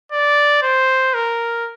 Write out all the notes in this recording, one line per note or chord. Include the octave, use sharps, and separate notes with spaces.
D5
C5
A#4